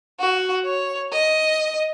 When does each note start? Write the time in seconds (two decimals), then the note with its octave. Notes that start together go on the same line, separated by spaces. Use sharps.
0.20 F#4
0.65 C#5
1.12 D#5